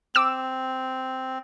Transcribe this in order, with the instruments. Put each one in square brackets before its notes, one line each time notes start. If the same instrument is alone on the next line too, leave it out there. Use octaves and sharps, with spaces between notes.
[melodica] C4 [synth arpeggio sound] D6 E6 E7